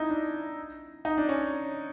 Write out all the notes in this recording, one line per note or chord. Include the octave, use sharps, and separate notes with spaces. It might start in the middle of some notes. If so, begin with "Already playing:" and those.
Already playing: D#4 E4
D4
D#4
D4
C#4